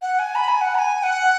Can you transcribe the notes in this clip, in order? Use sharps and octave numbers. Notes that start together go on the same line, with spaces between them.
F#5
G#5
B5
G#5
F#5
B5
G#5
F#5